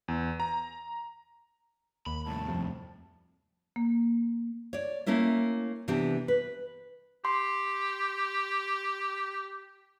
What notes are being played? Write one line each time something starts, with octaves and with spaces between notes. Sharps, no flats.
E2
A#5
D#2 B5
C2 A2 A5
F2
A#3
C#5 D5
A3 A#3 C#4 E4 A#4
C3 E3 B3 D4 G4
B4
G4 C6